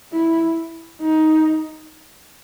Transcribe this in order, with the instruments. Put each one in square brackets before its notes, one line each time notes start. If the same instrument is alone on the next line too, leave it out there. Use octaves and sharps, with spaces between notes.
[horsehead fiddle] E4
D#4